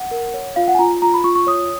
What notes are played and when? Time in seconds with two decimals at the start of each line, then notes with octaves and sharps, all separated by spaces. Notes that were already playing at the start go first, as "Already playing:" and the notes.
Already playing: F#5
0.11 A#4
0.34 C#5
0.56 F4 F5
0.68 F#5
0.74 G#5
0.79 F4 A#5
1.02 F4 A#5
1.14 B5
1.24 F4 C#6
1.35 C#6
1.47 C#5 D#6